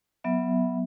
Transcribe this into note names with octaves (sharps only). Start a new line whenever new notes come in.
F#3 B3 E5